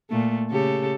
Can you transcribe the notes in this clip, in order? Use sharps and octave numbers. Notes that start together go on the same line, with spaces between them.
A#2 A3
C#3 G4 A4